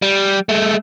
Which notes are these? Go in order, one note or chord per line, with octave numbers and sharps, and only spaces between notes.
G3
G#3 A3